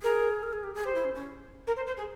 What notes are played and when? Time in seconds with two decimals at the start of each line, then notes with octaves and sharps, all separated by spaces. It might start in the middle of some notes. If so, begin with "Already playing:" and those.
0.02 G#4 A#4
0.43 A#4
0.53 G#4
0.64 G4
0.74 G#4
0.84 G4 C5
0.95 E4
1.05 C#4
1.15 C#4
1.66 A#4
1.76 C5
1.86 C5
1.96 G#4